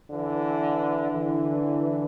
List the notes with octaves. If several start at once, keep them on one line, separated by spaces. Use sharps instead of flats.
D3 E3
D3 E3